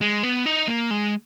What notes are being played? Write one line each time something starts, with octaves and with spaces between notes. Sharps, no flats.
G#3
B3
D#4
A#3
G#3